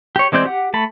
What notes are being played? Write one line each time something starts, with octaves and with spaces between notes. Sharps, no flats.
G4 C#5
E3 G#3 C4 D5 G6
G4 F#5
A3 A5 B5